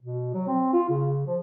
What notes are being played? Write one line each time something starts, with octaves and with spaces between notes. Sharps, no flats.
B2
F#3
C4
F4
C#3
F3